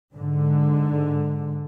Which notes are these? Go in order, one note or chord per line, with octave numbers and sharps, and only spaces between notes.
G#2 D3